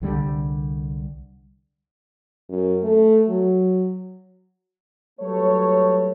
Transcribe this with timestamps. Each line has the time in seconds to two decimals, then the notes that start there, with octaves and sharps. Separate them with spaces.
0.01 C2 D3 G3
2.49 F#2
2.83 A3
3.29 F#3
5.20 F#3 G3 A3 B3 C#5